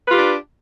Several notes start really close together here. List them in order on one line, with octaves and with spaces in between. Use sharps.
B4 F4 G4 D4